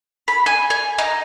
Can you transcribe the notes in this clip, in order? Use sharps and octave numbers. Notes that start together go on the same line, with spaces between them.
B5
G#5
G#5
D#4